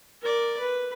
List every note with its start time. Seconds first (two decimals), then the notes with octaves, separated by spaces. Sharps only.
0.22 A#4 D5
0.59 B4